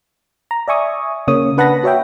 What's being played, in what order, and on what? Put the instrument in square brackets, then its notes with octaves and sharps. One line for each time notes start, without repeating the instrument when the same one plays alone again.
[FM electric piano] A#5
D5 E5 G#5 C#6 D#6
C#3 A#3 C#5 D#6
D4 B4 F#5 A5 B5 A#6
F#4 C#5 E5 G5